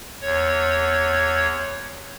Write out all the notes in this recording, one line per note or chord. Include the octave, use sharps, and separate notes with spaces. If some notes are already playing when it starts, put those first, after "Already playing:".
E2 C#5